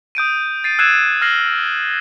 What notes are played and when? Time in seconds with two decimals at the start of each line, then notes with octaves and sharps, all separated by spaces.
0.15 D#6 G6 D7 D#7
0.64 A6 C7 D#7
0.79 E6 F#6 G#6 C7 D#7 E7
1.22 F6 A#6 C7 F#7